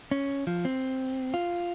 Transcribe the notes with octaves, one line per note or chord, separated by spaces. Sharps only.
C#4
F3
C4
F4